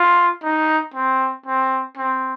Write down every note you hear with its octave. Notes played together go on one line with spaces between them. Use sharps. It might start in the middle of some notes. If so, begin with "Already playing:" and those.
Already playing: F4
D#4
C4
C4
C4